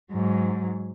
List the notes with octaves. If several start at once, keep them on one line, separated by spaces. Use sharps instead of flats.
G#2 F#3